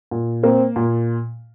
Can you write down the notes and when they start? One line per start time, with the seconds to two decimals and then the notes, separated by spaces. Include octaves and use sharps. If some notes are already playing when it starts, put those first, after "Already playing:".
0.11 A#2
0.43 A#3 C4
0.76 A#2